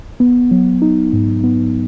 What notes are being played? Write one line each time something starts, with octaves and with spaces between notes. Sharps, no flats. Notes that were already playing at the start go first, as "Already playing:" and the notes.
B3
F#3
D#4
G#2
B3